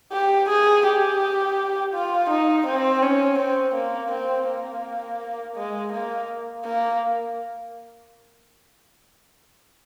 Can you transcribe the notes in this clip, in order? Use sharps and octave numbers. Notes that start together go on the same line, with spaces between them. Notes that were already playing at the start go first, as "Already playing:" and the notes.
G4
G#4
G4
F4
D#4
C4
C#4
C4
A#3
C4
A#3
G#3
A#3
A#3